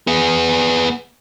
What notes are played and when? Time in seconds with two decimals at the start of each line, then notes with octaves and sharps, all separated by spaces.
0.07 B3 G#4